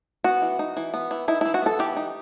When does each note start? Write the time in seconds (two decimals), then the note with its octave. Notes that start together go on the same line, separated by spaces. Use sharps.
0.24 B3 F#4
0.42 E3
0.59 D#4
0.77 E3
0.94 B3
1.11 E3
1.28 D#4 E4
1.41 E3 E4
1.54 F#4
1.62 B3 A4
1.79 E3 G4
1.97 D#4